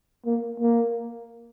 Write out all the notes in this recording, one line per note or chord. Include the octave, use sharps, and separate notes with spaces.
A#3
A#3